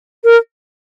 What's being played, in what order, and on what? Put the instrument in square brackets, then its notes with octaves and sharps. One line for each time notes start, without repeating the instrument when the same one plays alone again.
[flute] A#4